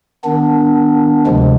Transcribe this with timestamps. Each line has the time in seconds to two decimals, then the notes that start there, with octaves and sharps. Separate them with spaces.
0.24 D#3 B3 D4
1.26 D2 C3 F3 G#3